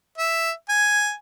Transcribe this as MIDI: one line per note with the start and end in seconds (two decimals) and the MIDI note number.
0.18 0.51 76
0.69 1.13 80